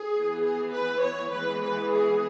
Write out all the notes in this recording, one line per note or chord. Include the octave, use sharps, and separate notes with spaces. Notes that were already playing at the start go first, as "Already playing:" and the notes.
Already playing: G#4
E3 B3
G#4
B4
C#5
E3 G#3 B3 B4
B4
G#4